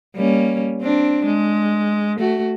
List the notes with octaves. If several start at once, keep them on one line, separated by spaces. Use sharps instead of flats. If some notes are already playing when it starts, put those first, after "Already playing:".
G3 A#3 C#4
C4 D4
G#3
A3 F#4